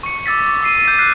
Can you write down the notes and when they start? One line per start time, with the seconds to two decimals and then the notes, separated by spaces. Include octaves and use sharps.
0.03 C#6 C#7
0.26 D6 E6 A6 B6
0.44 D6
0.61 C#6 E6 C7 D#7
0.84 G6 B6
0.98 F6 F#6 B6 C7